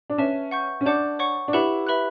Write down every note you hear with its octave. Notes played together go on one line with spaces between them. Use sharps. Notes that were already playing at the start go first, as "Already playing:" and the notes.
D4
C#4 B4 E5 A5
F#5 C#6 G6
C#4
D4 F#5 A5 D6 G6
C#5 F#5 C#6
D4
E4 G4 B4 F#5 B5
B4 E5 B5 F#6